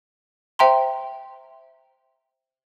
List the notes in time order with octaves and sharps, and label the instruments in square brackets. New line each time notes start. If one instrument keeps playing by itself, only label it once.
[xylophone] C5 E5 G5 A#5 C6